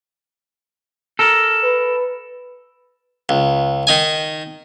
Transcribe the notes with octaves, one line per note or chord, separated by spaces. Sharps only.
A4 A#4
B4
C#2
D#3 D#4 G#5